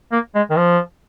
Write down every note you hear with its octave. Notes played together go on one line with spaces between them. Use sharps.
A#3
G#3
D#3
F3